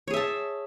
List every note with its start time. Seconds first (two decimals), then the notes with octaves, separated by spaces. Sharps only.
0.08 C#5
0.11 G#4
0.14 E5
0.17 A5